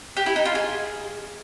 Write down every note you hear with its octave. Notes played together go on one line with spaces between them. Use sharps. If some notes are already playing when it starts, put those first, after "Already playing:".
G4
E4
D#4
F4
G#4